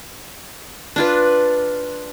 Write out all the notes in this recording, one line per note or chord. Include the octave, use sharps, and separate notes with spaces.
D4 F4 B4